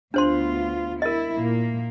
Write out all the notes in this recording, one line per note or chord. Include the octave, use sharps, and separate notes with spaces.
D2 B3 D4 F4 C5 C6
E4 A#4 D#5
A#2 A#3